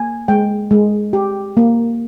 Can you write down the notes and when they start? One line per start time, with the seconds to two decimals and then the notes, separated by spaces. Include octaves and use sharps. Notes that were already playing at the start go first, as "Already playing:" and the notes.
Already playing: A#3 G#5
0.28 G#3 G5
0.71 G#3
1.13 G4
1.57 A#3